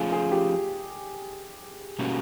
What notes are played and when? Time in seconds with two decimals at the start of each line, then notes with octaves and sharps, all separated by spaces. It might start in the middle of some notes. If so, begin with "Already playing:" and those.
Already playing: F3 A3 C#4 F4 G#4
0.12 G#4
0.32 G4
1.99 B2 G3 A#3 C#4 F#4